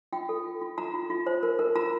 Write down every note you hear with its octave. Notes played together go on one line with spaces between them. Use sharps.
F4 G5
A4
F4
F4
F4 A#5
F4
F4
C5
A#4
A#4
F4 A#5